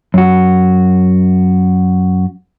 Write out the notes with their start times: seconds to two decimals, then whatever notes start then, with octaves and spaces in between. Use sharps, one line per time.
0.14 F#2 F#4